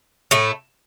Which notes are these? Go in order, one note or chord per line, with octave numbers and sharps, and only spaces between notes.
A2 A3